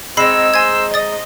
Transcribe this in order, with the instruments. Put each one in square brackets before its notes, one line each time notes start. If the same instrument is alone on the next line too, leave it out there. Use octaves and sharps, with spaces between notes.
[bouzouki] G#3 D#4 [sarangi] C4 [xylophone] B5 C7 [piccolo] E6
[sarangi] C5 [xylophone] G#5 G#6
[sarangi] D#5 [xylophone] D#6 A6